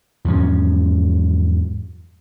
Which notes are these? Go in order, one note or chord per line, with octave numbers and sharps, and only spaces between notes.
E2 G#2 F3 C#4